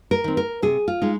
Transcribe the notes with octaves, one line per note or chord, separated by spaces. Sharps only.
A#4
D#3 C4
A#4
C3 G#4
F4
G#3 D#4